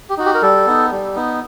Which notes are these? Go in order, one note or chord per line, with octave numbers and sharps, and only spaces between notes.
G4
D#4 F#4
G4
A#4
G3 A4
B3 D#4
G3
B3 D#4